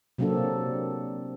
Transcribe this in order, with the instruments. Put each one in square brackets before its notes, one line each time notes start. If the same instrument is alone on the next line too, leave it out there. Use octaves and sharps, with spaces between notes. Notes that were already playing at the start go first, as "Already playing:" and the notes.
[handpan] C3 F#3 A#3 C4 D4 A4